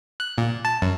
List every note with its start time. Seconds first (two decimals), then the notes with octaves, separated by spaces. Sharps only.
0.20 F#6
0.38 A#2
0.65 A5
0.82 F#2